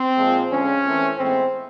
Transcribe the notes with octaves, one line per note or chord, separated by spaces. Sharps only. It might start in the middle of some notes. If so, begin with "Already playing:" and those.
Already playing: C4
A#2 F3 G#3
D3 F3 G#3 C#4
E3 A3 C4
A2 E3 G#3 B3 C4